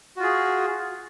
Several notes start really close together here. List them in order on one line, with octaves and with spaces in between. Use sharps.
F#4 F4 G#4